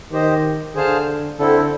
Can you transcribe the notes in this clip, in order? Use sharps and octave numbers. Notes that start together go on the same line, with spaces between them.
D#3 G4 C5 D#5
D3 G#4 C5 F5 A5
D3 C4 E4 A4